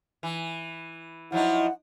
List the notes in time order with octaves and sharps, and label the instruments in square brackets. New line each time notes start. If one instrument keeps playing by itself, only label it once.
[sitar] E3
[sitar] F3 F#3 D#4 [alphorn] E4 [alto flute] F#5